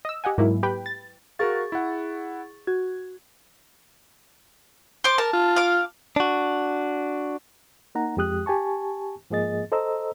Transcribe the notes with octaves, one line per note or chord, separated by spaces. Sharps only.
D#5 E6
G4 D#5 F#5 G#5
G#2 F#3 A#3 E4
G4 B4 G5 B5
A6
F#4 G#4 A#4 F5 C#6 A6
E4 F#5
F#4 G#6
C5 C6 D6
A#4 A5
F4
F5 D6
D4 F#4
A#3 D#4 F#5 A#5
F2 G#3 G4 D#6 F#6
G4 G#5 A5 C#6
G#2 F3 A#3 G#4 D#5 A6
A4 C5 D#5 A#5 E6